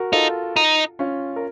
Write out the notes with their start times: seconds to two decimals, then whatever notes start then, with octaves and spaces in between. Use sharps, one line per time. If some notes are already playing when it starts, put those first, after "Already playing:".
Already playing: F#4 A#4
0.12 D#4 F4 A4
0.56 D#4
0.99 C#4 F4
1.36 A#4